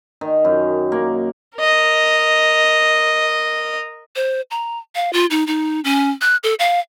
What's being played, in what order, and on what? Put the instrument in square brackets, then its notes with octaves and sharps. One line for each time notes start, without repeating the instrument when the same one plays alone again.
[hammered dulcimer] D#3
F#2
A#3
[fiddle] A#4 D#5
[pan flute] C5
A#5
F5
F4
D#4
D#4
C#4
F#6
A4
F5